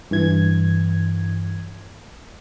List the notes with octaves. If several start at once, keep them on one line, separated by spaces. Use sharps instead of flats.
G2 E3 G#6